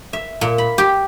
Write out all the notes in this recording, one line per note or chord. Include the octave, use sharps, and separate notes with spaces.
E5
A#2
B5
G4